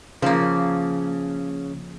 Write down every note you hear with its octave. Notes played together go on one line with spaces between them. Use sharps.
C#3 F3 A#3